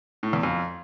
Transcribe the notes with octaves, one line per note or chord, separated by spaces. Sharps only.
A2
E2
F2